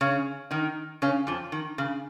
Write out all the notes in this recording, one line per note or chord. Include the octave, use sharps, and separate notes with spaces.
C#3 C#4
D#3 D#4
C#3 C#4
F2 F3
D#3
C#3